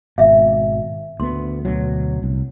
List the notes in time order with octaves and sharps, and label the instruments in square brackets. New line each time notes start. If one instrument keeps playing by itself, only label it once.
[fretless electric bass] G#1 B2 [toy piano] E5 F5
[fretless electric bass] D2 B3 [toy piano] C6
[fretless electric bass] D2 B2 F#3
C2